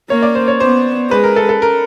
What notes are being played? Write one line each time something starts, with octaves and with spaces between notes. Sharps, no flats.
A#3 C#5
D5
C5
C#5
B3 C5
G#3 B4
A#4
A4
A4
A#4